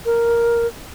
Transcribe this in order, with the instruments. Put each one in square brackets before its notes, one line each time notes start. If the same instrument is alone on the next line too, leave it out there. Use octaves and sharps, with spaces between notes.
[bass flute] A#4